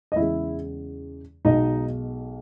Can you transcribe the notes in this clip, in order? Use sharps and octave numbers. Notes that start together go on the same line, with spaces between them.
D#5
E2 C#3 G#3 E4 E5
B1 B2 G#3 D#4 D#5